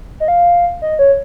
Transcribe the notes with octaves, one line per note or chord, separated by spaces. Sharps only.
D#5
F5
D#5
C#5